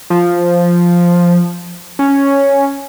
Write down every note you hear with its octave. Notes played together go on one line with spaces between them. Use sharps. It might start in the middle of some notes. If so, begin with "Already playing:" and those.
F3
C#4